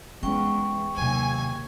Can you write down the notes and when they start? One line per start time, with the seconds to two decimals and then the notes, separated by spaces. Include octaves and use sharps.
0.23 E2 G#3 C#4 G5 C#6
0.97 D#2 C3 F#3 G#5